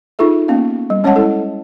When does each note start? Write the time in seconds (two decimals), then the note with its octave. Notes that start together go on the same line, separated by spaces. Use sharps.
0.19 D#4 F4 G#4 A4 E5
0.48 A#3 B3 C#4 F5
0.90 G3
1.04 G#3 C#4 C#5 D#5 F#5 A5
1.16 E4 A4